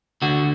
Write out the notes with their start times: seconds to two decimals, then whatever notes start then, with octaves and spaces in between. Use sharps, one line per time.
0.22 D2 D3 F#4